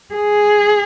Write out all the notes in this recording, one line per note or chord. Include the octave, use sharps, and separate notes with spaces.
G#4